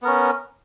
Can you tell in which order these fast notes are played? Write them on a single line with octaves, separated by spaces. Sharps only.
B3 A#4 C#4